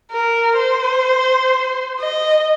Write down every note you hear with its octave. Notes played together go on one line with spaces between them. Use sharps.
A#4
C5
D#5